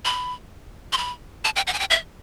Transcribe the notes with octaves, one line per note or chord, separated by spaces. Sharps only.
B5
C6
B5
A5
G5
F#5
G#5
G5
E5